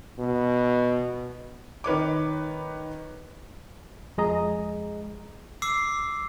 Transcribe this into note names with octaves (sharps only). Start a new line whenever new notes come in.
B2
D#3 B4 C#5 D6
F2 G#3 G#4 D#5 A#5 D#6
D6 E6 C7